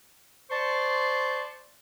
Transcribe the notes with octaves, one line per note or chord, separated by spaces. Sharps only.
C5 D5 A5 C6 C#6